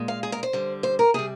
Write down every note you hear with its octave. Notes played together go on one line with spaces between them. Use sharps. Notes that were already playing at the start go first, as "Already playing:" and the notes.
Already playing: A#2 G#3
F5
G#4
A#4
C5
D3 G3
C5
A#4
C3 G3 G#4